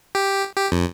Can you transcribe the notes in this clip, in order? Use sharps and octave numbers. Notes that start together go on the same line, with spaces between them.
G4
G4
F2